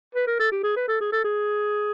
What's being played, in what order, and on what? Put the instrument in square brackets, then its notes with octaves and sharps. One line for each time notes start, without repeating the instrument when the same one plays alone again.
[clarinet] B4
A#4
A4
G4
G#4
B4
A4
G#4
A4
G#4